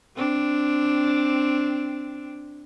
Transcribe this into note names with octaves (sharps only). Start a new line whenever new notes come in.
C4 D4